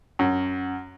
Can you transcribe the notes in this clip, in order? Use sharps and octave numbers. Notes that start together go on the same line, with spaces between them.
F#2